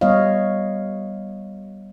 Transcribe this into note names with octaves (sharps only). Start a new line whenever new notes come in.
G3 B3 C#5 D#5 F5